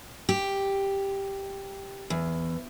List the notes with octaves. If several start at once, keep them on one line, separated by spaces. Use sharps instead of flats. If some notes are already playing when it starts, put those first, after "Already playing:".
G4
E2